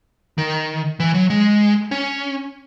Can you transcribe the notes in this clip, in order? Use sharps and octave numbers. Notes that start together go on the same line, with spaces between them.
D#3
E3
F#3
G#3
C#4